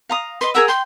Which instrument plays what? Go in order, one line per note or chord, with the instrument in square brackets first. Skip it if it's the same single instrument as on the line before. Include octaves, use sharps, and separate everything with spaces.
[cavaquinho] F5 A#5 D#6
[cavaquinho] B4 D#5 [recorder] C6
[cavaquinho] G#4 A#4 F#5 [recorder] E6
[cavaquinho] G5 [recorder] C6